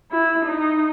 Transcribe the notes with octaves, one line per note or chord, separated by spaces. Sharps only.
E4
D#4